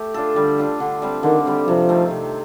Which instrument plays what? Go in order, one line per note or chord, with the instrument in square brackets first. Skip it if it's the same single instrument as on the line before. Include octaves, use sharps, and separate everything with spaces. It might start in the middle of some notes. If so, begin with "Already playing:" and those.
Already playing: [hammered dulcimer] A3 G4
D4 F4 A4
[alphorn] D3 [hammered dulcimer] G3
[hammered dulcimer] D4 F4 A4
D3
G3 C4
[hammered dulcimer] D3 [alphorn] D#3
[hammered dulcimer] G3 C4
[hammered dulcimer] C3 [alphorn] F3
[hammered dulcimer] D#3 A3 C4
C3